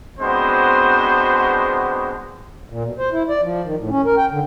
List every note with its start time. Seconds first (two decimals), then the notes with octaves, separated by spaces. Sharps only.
0.20 G#3 B3 C4 D4 F#4 C5
2.70 A#2
2.84 B2
2.98 C5
3.12 E4
3.29 D5
3.42 F3
3.63 D#3
3.78 A2
3.90 C#4
4.05 A#4
4.17 G5
4.31 D3